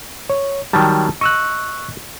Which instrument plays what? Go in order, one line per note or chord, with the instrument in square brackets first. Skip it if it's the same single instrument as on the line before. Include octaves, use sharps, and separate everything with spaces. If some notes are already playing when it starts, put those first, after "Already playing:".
[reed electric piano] C#5
[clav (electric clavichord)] D#3 F#3 G3 [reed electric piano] A5
[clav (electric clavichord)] D#5 [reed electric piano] C#6 E6 F#6